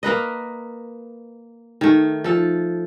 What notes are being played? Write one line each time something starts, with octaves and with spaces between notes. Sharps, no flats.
A#3 A#4 B4 D#5
D#3 A3
F3 A4